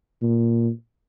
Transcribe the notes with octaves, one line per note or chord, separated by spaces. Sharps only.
A#2